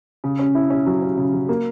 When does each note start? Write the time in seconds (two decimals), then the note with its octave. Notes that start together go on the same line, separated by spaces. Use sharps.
0.24 C#3
0.39 C#4
0.55 E4
0.70 C#4
0.86 F#3
1.02 C#4
1.17 C#3
1.33 F#3
1.49 A#3